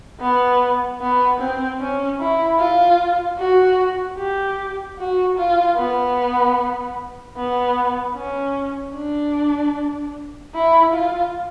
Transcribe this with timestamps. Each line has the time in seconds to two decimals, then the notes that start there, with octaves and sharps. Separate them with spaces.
0.21 B3
1.01 B3
1.40 C4
1.80 C#4
2.20 E4
2.59 F4
3.39 F#4
4.18 G4
4.99 F#4
5.37 F4
5.77 B3
7.37 B3
8.16 C#4
8.96 D4
10.54 E4
10.94 F4